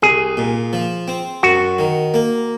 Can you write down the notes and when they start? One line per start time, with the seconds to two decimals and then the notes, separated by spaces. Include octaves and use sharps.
0.03 C2 G#4
0.37 A#2
0.73 F3
1.08 C4
1.43 F#2 F#4
1.79 D#3
2.14 A#3